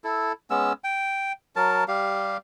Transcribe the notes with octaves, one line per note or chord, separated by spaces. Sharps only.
E4 A4
G#3 B3 C#4 E6
G5
F#3 A#4 A5
G3 G4 F5